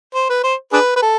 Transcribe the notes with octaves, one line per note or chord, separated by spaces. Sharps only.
C5
B4
C5
D4 G#4 B4
B4
A4